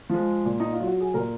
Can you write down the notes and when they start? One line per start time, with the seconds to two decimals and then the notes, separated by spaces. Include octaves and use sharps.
0.09 F3 G#3
0.45 A#2
0.60 D#4
0.73 F4
0.80 F#3
0.87 F#4
1.00 G#4
1.14 A#2 A#4